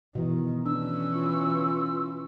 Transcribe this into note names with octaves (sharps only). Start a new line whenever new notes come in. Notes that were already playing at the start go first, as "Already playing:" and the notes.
B2 D#3 E3
E3 C#4 D4 E6
F4